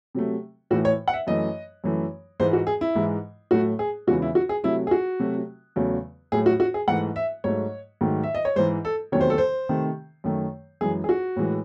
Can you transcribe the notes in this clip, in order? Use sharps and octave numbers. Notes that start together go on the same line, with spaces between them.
C3 F#3 A3
A2 E3 A3 F#4
C#5
F#5
E5
F#2 E3 A3 D#5
F#2 E3 A3
G#2 E3 G#3 C5
F#4
G#4
E4
G#2 E3 G#3
A2 F#3 A3 F#4
G#4
E2 C#3 E3 G#3 F#4
E4
F#4
G#4
C3 F#3 A3 E4
G#4
F#4
C3 F#3 A3
E2 C#3 F#3 A3
A2 F#3 A3 G#4
F#4
F#4
G#4
G#2 E3 A3 F#5
E5
G#2 F#3 A3 C#5
G#2 D#3 F#3 A3
E5
D#5
C#5
G#2 E3 G#3 C5
A4
E2 C3 D#3 F#3 A3 C#5
C5
A4
C5
C3 D#3 A3
F#2 D#3 A3
F#2 E3 G#3 G#4
G#4
F#4
A2 E3 G#3